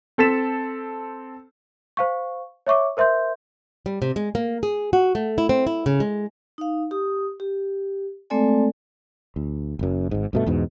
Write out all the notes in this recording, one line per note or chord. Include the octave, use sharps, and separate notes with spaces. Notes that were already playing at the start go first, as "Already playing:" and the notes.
C4 A4 A6 B6 E7
C5 F5 C#6
C#5 E5 C#6 D6
A#4 C5 E5 C6 G6
G3
C3
G#3
A#3
G#4
F#4
A3
E4
C4
E4
C#3
G#3
D#4 F5
G4 D#6
G4
G#3 A3 C4 A4 D5 G#5
D2
F#1 F#2
G#1 G#2
G2 B2 A3
E2 G#2 B2